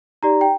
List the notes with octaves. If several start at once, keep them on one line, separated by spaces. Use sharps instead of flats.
D#4 G4 D5 A#5
G5